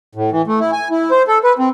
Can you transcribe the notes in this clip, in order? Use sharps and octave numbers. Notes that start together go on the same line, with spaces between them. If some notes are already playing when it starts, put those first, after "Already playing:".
A2
E3
A3
E4
G#5
E4
C5
A4
B4
C4